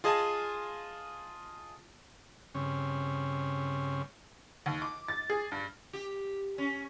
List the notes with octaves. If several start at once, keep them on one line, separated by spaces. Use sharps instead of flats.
F4 G#4 D#5 G#5 A5
G2 C#3 C4 C#4
D#2
D6
A6
G#4
G2
G4
C#4